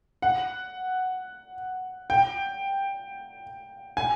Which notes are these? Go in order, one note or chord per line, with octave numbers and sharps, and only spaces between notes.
F#5
G5
G#5